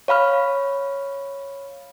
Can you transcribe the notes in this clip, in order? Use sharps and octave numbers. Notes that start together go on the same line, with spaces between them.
C#5 F5 B5 F6